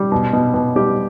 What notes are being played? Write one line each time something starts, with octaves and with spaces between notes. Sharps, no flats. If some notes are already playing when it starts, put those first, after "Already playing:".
Already playing: G3
B2
B2
B2
G3 G4